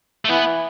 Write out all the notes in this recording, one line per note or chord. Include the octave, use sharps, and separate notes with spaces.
A3
E3 B3